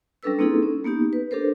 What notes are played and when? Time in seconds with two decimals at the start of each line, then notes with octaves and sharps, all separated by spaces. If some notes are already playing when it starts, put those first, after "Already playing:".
0.23 G3 C#4 D4 A4 B4 E6
0.39 A#3 C4 D#4 E4 G#4 A4
0.62 C#4
0.84 A#3 B3 D#4 G4
1.13 B4
1.31 D4 G4 A4 A#4 C5